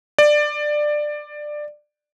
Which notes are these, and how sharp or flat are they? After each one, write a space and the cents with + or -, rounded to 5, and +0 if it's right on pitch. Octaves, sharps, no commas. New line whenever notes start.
D5 +15